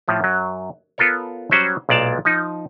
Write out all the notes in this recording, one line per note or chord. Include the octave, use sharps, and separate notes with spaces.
A2 F3 G3
F#2 F#3
B3 F4 A4 A#4 C#5
F#3 G3 C#4 F#4 C5
B1 A#2 G#3 D5 F5 A5
F3 D#4